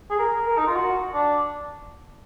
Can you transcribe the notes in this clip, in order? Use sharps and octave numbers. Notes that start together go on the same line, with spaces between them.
G#4
A#4
A#4
D#4
F4
F#4
D4